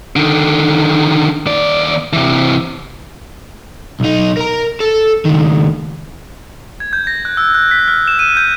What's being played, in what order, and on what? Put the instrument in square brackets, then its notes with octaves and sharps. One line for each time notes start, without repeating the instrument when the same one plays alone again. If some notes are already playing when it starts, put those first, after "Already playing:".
[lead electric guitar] D3 D#3
D#2 D5
C3 E3
[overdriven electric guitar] B1 D#4
A#4 A#5
A4
C#2 D#3
[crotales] G#6
G6
A#6
F#6
E6
F#6
B6
F6
E7
D#7
G6